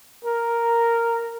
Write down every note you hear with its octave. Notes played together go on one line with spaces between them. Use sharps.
A#4